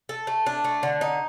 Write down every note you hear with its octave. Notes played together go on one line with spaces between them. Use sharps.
A4
A3
D4
A3
D3
D#4